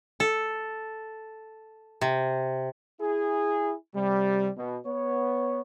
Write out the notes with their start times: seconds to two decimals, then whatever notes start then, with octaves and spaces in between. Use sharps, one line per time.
0.20 A4
2.01 C3
3.00 E4 G#4
3.94 C3 G3
4.56 B2
4.86 B3 C#5